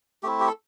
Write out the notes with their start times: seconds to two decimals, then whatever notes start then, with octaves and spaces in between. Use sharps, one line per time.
0.23 A3 C4 E4 G4
0.40 G4
0.47 A4